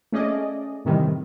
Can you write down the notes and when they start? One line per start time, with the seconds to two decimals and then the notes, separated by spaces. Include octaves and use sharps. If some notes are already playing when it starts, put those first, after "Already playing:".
0.12 A3 C#4 G#4 D5 D#5
0.85 A2 C3 D#3 E3 G3